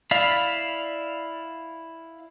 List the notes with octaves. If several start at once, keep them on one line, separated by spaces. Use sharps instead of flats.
E4 D5 F5 B5